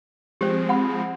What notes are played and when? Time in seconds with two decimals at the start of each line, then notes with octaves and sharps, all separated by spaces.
0.41 F3 G#3 C4 G4 C5
0.69 F#5 B5